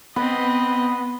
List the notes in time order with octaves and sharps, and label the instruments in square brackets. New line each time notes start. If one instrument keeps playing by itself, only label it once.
[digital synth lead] B3 [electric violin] C4 D#5 [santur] B4